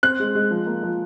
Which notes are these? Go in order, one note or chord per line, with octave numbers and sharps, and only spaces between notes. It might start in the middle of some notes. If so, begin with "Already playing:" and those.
C4 F#6
G#3
G#3
F3
A#3
F3